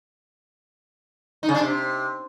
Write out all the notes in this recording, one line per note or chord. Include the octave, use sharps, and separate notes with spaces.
D#4
C#3
D4
C3